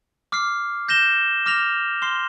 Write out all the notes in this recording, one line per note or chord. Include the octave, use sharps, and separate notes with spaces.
D6 F6 C7
G6 A#6 E7 G7
D6 F6 A#6 F7
C6 F6 C7 G7